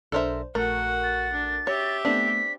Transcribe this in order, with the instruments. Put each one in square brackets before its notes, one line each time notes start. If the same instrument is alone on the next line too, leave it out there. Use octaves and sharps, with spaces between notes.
[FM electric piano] B1 D4 C5 [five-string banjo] A4 A#4 E5
[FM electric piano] A#1 A#4 [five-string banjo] A3 [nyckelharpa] F#4 F#5
[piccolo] A6
[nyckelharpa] D4
[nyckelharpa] G4 E5 [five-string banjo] C#5
[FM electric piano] A3 B3 [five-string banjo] C4 D4 [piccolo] B6